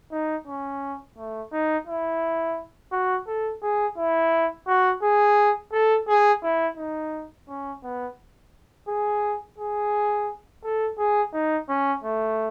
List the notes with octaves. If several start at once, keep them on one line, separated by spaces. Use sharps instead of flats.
D#4
C#4
A3
D#4
E4
F#4
A4
G#4
E4
F#4
G#4
A4
G#4
E4
D#4
C#4
B3
G#4
G#4
A4
G#4
D#4
C#4
A3